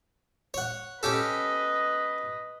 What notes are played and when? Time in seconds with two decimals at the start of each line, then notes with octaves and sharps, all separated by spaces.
0.54 C#5 F#5
1.03 C#4 G4 A4 B4 D#5